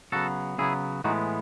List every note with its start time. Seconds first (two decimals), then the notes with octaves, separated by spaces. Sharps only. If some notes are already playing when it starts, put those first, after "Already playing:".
0.12 C#3 F#3 B3 F#4 A4
0.58 C#3 F#3 B3 E4 G#4
1.04 A2 E3 G#3 B3 D#4 F#4